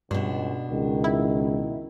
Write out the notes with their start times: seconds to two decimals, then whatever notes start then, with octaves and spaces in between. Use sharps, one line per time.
0.11 C#2 G2 B2 D4
0.71 C#2 D#3
1.04 E4